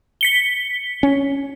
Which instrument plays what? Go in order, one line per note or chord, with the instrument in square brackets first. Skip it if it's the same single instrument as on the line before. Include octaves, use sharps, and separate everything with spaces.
[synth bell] B6 C#7 G7
[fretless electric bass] C#4